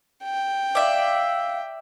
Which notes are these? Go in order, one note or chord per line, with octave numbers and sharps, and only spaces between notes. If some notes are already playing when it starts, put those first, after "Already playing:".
G5
D5 E5 F5